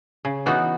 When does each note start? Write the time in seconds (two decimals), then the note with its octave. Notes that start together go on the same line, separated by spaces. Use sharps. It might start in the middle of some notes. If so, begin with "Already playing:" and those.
0.25 C#3
0.46 E3 B3 D#4 F#4